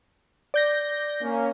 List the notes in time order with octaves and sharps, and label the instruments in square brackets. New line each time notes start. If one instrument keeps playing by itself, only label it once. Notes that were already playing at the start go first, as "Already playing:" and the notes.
[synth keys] D5 G6 A#6
[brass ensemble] A#3 C#4